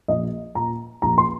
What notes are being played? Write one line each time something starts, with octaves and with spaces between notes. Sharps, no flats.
A#1 D#5
A#2 A#5
A#1 A#5
C6